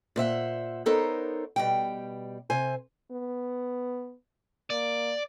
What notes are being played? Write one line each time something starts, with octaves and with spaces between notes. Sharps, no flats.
A#2 C5 E5 F#5
B3 D#4 A4 A#4 C5 C#5
B2 G3 G5
C3 C5 G#5
B3
A#3 D5